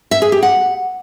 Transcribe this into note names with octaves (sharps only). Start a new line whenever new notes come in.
E5
G#4
G4
F#5